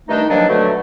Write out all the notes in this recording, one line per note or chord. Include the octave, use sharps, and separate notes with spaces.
G2 D#3 A3 D4 D#4
G2 D#3 F3 F#3 A#3 D4
B2 D3 F#3 A3